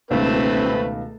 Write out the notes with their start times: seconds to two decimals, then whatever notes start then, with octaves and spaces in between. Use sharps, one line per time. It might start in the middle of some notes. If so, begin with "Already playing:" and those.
0.11 D#1 C#2 B2 D#3 A3 C4 B4